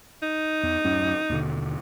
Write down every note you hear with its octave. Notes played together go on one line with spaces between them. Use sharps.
D#4
E2
D1 F#2 C#4
D#2 B2 D3